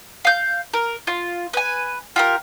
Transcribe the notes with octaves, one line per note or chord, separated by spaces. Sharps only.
F5 G6
A#4
F4
B4 G#5
F4 G4 A#4